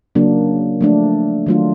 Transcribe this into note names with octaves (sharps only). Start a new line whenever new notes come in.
C#3 F#3 A#3 D4
F3 A3 D4
D#3 F#3 A3 D4 F4